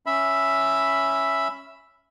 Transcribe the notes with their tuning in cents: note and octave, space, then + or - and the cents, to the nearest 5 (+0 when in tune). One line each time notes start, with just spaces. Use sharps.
C#4 +0 E5 +0 B5 +0